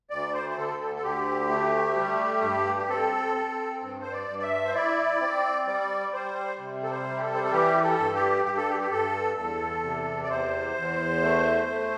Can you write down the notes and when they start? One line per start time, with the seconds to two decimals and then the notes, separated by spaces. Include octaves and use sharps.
0.10 D2 D5
0.34 C5
0.50 C5
0.57 D3 A4
0.80 A4
0.96 A4
1.03 D2 G4
1.49 A3
1.96 G3
2.42 G2
2.78 G4
2.89 C4 A4
3.35 C4
3.82 G2
4.01 C5
4.12 D5
4.28 G2
4.39 D5
4.43 E5
4.65 C5
4.74 E4 D5
5.21 C4
5.66 G3 D5
6.13 G3 C5
6.59 C3
6.83 A4
6.90 C5
7.06 G3
7.16 G4
7.21 A4
7.34 C5
7.44 A4
7.52 E3 G4
7.83 A4
7.99 G2
8.14 G4
8.45 G2 G4
8.57 A4
8.69 G4
8.81 G4
8.91 G2 A4
9.37 E2 A4
9.84 C3
10.23 D5
10.30 E2 C5
10.76 E2
11.22 A3
11.69 A3